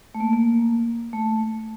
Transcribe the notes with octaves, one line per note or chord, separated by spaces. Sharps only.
A3
A#3
A#3
A3